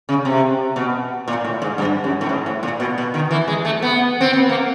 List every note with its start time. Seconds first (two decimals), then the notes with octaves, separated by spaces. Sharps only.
0.09 C#3
0.25 C3
0.76 B2
1.28 A#2
1.44 A2
1.62 G#2
1.78 G2
2.04 F#2
2.21 A2
2.29 G#2
2.46 A2
2.63 A#2
2.80 B2
2.98 B2
3.14 D#3
3.31 E3
3.48 G#3
3.65 A3
3.82 B3
4.21 C4
4.33 B3
4.49 A#3